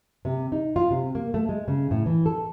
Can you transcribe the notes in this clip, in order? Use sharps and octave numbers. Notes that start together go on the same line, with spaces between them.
C3
D#4
F4
C3
A#3
A3
G#3
C#3
A2
E3
A4